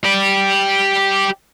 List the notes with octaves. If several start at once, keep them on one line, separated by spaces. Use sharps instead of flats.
G4 D5